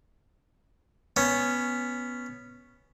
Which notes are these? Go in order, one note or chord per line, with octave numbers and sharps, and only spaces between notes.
B3 C#4